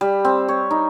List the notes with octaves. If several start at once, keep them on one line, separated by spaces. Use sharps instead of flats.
G3
C4
C#5
D#4